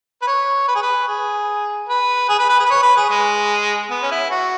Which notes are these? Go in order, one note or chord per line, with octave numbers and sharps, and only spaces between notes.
B4
C#5
B4
G#4
B4
G#4
B4
G#4
B4
B4
G#4
B4
C#5
B4
G#4
G#3
B3
C#4
E4
F#4